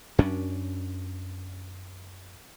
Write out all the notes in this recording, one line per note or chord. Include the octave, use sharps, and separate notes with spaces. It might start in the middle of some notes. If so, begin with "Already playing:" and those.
F#2 C#4 D4